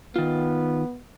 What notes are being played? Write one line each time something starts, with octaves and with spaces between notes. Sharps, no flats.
D#3 B3 F4